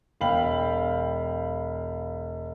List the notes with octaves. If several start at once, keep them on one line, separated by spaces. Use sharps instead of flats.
E1 F5 G5 B5 F#7